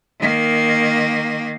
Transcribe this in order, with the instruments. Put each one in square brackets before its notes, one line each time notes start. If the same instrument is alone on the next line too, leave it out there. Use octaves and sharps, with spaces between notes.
[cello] D#3 A#3